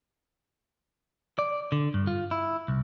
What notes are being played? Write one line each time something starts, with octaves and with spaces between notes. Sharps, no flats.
D5
D3
G2
F4
E4
C2